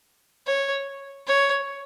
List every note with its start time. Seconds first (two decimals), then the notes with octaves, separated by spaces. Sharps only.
0.47 C#5
1.27 C#5